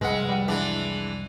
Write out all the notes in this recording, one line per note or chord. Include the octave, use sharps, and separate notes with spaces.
C2 F2 G#3 B4 F#5
G3 F#5
E3 G#3 D4